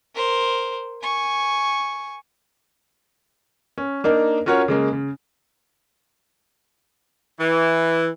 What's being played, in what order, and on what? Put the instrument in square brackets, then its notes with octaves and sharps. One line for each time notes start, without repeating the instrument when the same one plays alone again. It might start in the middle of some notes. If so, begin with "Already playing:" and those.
[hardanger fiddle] A#4 C5
G#5 C#6
[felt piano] C#4
A#3 D4 D#4 A#4
C#4 F4 F#4 A#4 C#5
C#3 G#3 A#3
C#3
[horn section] E3